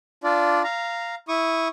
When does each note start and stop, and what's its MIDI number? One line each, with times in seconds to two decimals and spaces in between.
0.24 0.62 62
0.24 0.62 65
0.24 0.62 74
0.64 1.15 77
0.64 1.15 82
1.28 1.68 64
1.28 1.68 85
1.28 1.68 87